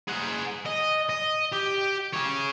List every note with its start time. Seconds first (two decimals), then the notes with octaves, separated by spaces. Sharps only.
0.08 G#4 F#5
0.66 D#5
1.09 D#5
1.53 G4
2.13 G#4 C#5